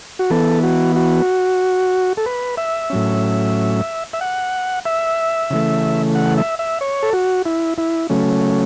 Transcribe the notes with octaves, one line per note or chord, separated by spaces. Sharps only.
F#4
E3 B3 A4
F#4
F#4
A4
B4
E5
A2 F#3 C#4
E5
F#5
E5
C#3 E3 A3
F#5
E5
E5
C#5
A4
F#4
E4
E4
C#3 F#3 A3 C#4